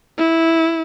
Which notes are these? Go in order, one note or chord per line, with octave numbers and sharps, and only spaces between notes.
E4